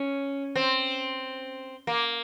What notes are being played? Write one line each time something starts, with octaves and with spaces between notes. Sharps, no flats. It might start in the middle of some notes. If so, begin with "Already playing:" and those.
Already playing: C#4
C4
A#3